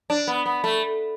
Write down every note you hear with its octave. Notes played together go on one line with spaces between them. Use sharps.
D4
B3
B3
A3